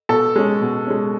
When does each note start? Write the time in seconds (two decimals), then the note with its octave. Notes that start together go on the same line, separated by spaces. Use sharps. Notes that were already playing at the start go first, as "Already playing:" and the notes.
0.09 B2 A4 A5
0.36 G#3 C#4
0.61 B2
0.87 G#3 C#4